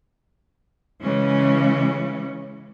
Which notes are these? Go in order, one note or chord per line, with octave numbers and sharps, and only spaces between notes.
C#3 E3 G#3 C#4